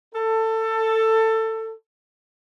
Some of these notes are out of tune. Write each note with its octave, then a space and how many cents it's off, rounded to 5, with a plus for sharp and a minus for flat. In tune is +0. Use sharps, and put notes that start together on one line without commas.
A4 +20